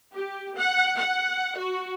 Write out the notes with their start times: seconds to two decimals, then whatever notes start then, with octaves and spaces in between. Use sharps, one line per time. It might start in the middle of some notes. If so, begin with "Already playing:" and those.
0.14 G4
0.56 F#5
0.98 F#5
1.58 F#4